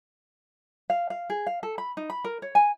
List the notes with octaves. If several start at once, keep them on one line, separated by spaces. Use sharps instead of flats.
F5
F5
G#4
F5
A4
B5
D#4
B5
A#4
C#5
G#5